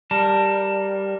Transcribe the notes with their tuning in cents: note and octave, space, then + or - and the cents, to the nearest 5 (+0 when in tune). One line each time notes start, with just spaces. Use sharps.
G3 +0 A#4 +0 A5 +15